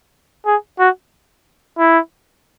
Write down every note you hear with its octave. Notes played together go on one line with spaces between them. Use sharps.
G#4
F#4
E4